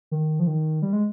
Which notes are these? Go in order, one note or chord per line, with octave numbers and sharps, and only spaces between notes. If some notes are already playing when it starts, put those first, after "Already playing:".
D#3
F3
D#3
G3
G#3